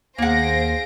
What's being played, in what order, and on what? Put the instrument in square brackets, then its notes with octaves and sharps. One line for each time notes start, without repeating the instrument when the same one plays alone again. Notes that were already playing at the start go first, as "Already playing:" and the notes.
[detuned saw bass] D#2 [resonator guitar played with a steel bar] A#3 F#5 [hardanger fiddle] G#4 F5 [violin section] C5 A#6 D7